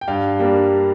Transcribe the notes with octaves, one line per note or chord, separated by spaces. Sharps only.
G5
G2 F5
G3 A#3 D4